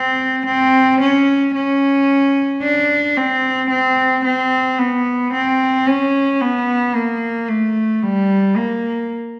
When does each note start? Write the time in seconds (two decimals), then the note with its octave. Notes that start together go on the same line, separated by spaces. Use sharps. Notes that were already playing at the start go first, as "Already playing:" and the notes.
Already playing: C4
0.46 C4
1.01 C#4
1.54 C#4
2.62 D4
3.17 C4
3.70 C4
4.25 C4
4.79 B3
5.33 C4
5.87 C#4
6.42 B3
6.95 A#3
7.49 A3
8.03 G3
8.57 A#3